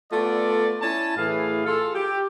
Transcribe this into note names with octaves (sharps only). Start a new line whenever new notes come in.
A3 B3 F4 A4 D5
C#4 E4 A5
A2 E3 A3 G#4 F5
F4 G#4 A4
G4